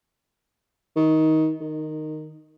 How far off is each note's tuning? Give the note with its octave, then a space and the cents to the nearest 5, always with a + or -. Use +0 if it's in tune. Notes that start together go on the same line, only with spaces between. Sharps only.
D#3 +20
D#3 -10